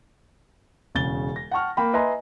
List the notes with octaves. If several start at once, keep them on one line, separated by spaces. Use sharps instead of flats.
E1 C#3 A6 G7
A#6
F#5 G5 A5 C#6 F6
A#3 G5 B5
B4 D#5 E5 G#5 A#5 C6